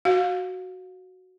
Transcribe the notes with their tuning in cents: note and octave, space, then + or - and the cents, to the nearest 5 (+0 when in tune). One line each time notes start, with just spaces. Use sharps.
F#4 +0 F5 +20